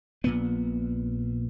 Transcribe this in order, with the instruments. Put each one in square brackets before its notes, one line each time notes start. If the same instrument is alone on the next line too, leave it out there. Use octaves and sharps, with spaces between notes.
[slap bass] A#1 A#2 B3